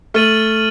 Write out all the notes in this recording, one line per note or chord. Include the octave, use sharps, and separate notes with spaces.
A3 F6 A6 D#7 F#7